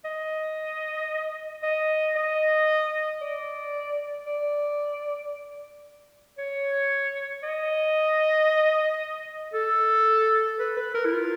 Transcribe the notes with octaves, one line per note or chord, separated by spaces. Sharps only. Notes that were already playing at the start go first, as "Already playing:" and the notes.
D#5
D#5
D#5
D5
D5
C#5
D#5
A4
B4
B4
A#4
E4
F4